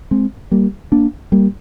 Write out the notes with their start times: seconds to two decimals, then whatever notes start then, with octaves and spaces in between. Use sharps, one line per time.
0.11 G#3 C4
0.51 G3 A#3
0.92 A#3 D4
1.32 G3 A#3